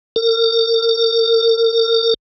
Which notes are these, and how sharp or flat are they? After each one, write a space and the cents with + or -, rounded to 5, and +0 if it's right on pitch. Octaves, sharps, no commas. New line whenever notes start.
A#4 -35